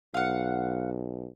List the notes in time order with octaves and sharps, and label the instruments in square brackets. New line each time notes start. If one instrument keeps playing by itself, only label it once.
[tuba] B1 [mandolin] F5 F#5